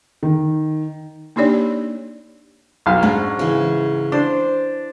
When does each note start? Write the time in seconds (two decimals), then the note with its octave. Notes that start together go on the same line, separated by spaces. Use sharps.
0.23 D#3
1.36 A#3 D4 D#4 G4 C#5 D5
2.86 B1 F5
3.03 G#2 C#4 D4
3.39 C#3 E3
4.12 D4 C5